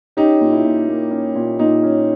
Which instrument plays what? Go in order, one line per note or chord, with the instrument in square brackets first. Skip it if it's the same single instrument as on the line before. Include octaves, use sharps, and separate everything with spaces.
[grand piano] C#4 D#4 G4
A#2
E4
A#2
A#3
C#4
A#2
A#2 D#4
C#4